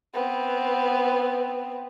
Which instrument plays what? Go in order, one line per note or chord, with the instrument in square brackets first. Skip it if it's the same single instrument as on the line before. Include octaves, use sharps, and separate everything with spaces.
[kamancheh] B3 C4